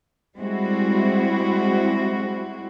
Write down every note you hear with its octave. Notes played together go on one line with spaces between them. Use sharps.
G3 G#3 C4 E4 F#4